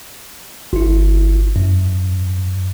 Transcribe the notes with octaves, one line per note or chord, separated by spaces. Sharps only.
G1 E4
F#2